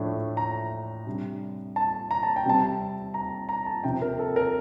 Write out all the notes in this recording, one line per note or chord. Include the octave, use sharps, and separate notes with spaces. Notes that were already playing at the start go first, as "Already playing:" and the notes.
Already playing: A2 F3 A3 D4
A#5
C3 G3 D4
A5
A#5
A5
G5
C3 G3 C4 A5
A#5
A#5
A5
C3 F3 C4 G5
A#4
A4
A#4